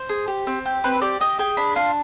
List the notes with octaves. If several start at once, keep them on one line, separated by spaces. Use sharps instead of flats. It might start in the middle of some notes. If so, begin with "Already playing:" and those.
Already playing: C5
G#4
G4
C4
G4
C4 B4
G4 D5
G4 D#5
G#4 G5
D4 B5
F4 C6